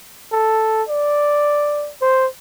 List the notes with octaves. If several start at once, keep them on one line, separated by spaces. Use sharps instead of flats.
A4
D5
C5